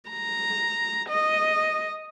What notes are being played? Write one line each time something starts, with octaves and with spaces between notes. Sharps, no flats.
A#5
D#5